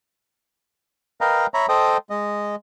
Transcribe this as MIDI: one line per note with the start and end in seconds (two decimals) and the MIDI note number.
1.21 1.47 70
1.21 1.47 71
1.21 1.47 75
1.21 1.47 77
1.21 1.47 79
1.21 1.47 82
1.54 1.66 73
1.54 1.66 76
1.54 1.66 82
1.54 1.66 83
1.69 1.97 69
1.69 1.97 72
1.69 1.97 75
1.69 1.97 79
1.69 1.97 87
2.10 2.56 56
2.10 2.56 75